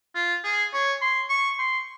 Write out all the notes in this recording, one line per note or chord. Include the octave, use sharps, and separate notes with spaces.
F4
G#4
C#5
C6
C#6
C6